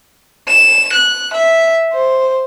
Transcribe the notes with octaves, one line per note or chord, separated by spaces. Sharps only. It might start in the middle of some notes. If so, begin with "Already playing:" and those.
E7
F#6
E5
C5